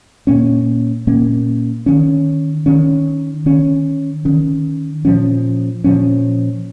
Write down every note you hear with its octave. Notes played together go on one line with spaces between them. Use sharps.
A#2 A#3 C#4
A#2 A#3 C#4
D#3 C#4
D#3 C#4
D#3 C#4
D#3 C#4
A#2 F3 C#4
A#2 F3 C#4